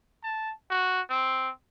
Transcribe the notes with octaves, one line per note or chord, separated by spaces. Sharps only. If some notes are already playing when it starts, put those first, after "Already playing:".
A5
F#4
C4